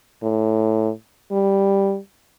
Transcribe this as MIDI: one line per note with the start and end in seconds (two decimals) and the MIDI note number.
0.23 0.91 45
1.31 1.98 55